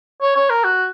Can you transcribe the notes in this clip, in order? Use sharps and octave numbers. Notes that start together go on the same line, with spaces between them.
C#5
C#5
A#4
F#4